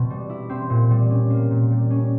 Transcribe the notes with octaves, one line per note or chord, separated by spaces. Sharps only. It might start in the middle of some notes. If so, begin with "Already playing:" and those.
Already playing: B2 C4 E4
G3
E4
C4
A#2
G3
C#4
A#3
A#2
G3
C#4